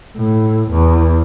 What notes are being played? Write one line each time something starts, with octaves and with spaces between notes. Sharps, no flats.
A2
E2